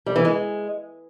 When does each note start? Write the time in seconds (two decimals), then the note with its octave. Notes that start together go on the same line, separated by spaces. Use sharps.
0.06 G3
0.16 E3
0.25 G#3